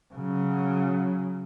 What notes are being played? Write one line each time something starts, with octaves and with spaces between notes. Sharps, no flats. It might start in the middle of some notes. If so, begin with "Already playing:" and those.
C#3 F#3